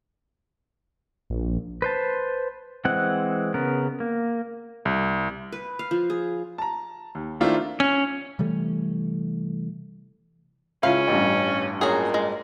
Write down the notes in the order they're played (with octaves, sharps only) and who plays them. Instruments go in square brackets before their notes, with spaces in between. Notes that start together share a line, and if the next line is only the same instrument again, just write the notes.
[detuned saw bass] A#1
[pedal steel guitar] B4 C5 A5
E3 G#3 C4 F#5
C#3 B3 A#4
A#3
[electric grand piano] C2
[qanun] B4
F5
F3
G#4
[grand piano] A5 A#5
D#2
D#3 A3 C4 D4 E4 F4
[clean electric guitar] C#4
[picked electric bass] C3 E3 G3 A3
[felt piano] C#2 [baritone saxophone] C#4 [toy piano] E4 F4 E5 [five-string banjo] F5
[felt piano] A1 G2
[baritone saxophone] A#2 [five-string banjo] F#3 G#4 [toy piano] C#4 F#5 D#6
[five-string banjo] G#3